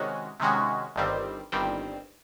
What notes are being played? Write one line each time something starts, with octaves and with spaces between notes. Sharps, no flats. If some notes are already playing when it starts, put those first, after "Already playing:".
Already playing: C3 D#3 G#3 C#4 F#4
C3 D#3 G#3 C#4 F#4
G1 G2 D#3 G3 C4
G1 G2 D#3 G3 C4